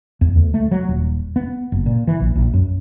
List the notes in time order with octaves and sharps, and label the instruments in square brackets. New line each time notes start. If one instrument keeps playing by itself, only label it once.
[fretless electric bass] E2
D2
A3
F#3
D#1
B3
F#1
A#2
E3
A#1
A#1
F#2